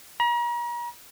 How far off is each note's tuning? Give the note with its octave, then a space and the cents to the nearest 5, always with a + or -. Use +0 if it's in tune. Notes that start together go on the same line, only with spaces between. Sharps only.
A#5 +40